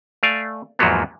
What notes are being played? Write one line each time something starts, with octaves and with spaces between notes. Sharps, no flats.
A3 D5 F5 G#5
E2 G#2 F3 F#3 A#3 B3